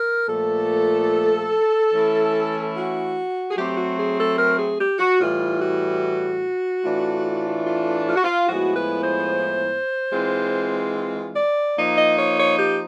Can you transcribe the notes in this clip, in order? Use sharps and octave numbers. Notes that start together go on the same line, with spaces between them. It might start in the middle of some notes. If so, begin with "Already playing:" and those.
Already playing: A#4
A#2 F3 A3 A4
E3 A3 C#4 E4
F#4
G#4
F#3 A3 C4 G4
F#4
G#4
A4
A#4
G#4
G4
F#4
A2 E3 G3 F4
F#4
A2 E3 A3 D4 F4
F4
F4
F#4
F4
A2 F3 G#3 B3 E4 F#4
B4
C5
E3 G#3 C4 F4
D5
F3 A#3 D#4
D#5
C#5
C#5
G4